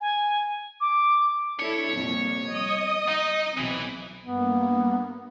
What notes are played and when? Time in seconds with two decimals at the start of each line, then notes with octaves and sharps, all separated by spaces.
0.01 G#5
0.81 D6
1.60 D4 E4 A4 C#5
1.93 C2 F2 A#2
2.50 D#5 D#6
3.09 D#4
3.58 B1 E3 C4
4.25 G2 A#3 B3